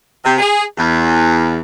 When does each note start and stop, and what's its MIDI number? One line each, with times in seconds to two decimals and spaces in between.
0.25 0.38 48
0.38 0.63 68
0.78 1.60 40